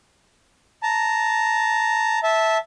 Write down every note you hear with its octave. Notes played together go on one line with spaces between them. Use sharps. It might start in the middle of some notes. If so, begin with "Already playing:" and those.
A5 A#5
E5 A5